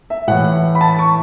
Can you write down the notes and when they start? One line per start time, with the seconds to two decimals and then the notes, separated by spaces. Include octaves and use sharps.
0.10 E5
0.27 A2 E3 F#5
0.75 B5
0.81 A5
0.99 C#6